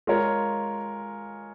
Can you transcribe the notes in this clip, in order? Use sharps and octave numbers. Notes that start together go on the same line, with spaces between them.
G#3 F4 A#4 C#5